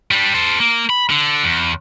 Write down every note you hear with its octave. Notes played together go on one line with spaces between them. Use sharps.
G3 D4
A4 C5
A#3
B5
D3
E2